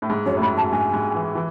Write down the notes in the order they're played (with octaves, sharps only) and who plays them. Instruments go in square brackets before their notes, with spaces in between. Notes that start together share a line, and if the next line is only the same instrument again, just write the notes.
[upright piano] A2
G#2
[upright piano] F#2 [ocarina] C#5
[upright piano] A2
[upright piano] G#2 [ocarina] B5
[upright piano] F#2 [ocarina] A5
[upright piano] G#2 [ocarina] G#5
[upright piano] G#2
E3
E3